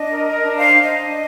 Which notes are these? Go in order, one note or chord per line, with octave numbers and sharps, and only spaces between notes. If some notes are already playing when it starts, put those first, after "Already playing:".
Already playing: D4 D#5
A#4
A#4
D4
C5 F5
D4
D#5
D4
D4